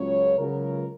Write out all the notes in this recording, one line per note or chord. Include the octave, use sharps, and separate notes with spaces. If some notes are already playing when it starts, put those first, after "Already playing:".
Already playing: C#2 C#3 F#3 C#5
C#2 C#3 F#3 A#4